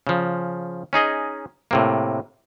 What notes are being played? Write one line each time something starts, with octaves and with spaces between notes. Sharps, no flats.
C#3 F3
C#4 D#4 G#4 D#5
A2 C3 A#3